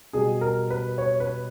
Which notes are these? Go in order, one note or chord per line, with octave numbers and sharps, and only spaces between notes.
B2 G3 G#4
A#4
B4
C#5
B4